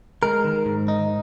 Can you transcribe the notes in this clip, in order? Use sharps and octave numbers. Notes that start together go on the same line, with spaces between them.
G#3 A#4
D#3
G#2
D#4